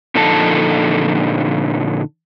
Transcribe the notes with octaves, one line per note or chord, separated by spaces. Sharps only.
A#2 D3 F3 D#4 A4 A5